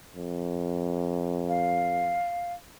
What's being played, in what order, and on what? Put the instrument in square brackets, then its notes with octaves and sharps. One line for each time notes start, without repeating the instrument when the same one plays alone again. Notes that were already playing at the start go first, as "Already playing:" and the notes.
[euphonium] F2
[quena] F5